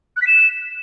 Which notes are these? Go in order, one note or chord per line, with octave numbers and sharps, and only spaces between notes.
F#6
B6
E7